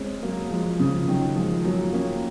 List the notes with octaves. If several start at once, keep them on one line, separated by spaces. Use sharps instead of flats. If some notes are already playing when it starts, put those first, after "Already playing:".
Already playing: G#3 C4 C#4
F#3 A#3
F3 G#3
C#3 F3
D#3 F#3
F3 G#3
F#3 A#3
A#3 C#4